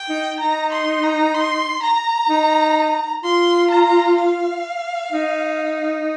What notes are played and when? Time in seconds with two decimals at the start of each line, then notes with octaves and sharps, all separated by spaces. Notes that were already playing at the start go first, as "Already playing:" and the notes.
Already playing: G5
0.09 D#4
0.40 D#4 A#5
0.72 C6
1.03 A#5
1.35 C6
1.83 A#5
2.29 D#4
3.24 F4 C6
3.71 A#5
4.18 F5
5.12 D#4